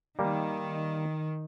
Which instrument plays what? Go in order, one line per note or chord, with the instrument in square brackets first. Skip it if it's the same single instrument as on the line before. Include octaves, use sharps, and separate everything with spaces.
[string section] D#3 [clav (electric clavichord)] G3 A#3